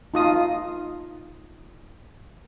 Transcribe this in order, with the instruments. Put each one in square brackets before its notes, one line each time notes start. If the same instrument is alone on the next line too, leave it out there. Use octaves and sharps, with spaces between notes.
[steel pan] D#4 F4 D#6